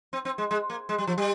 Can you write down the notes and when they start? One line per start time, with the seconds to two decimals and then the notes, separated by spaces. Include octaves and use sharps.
0.13 C4
0.25 C4
0.38 G#3
0.51 G#3
0.70 A#3
0.89 G#3
0.98 G3
1.07 F3
1.18 G3